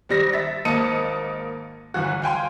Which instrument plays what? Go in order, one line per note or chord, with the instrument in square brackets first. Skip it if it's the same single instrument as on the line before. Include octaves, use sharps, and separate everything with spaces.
[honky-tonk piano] G#1 G3 A#6
E5 A6
G#1 A#3 D#5 A5 C#7 D#7
G1 E3 F#4
F5 G5 G#5 C6